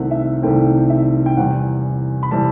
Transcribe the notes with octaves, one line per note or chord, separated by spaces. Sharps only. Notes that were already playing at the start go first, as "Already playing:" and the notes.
Already playing: C2 C3 D#3 A3 C4 F#5
E5
C2 C3 D#3 A3 C4 G5
E5
G5
E2 C3 E3 G3 F#5
B5
C3 E3 G3 A5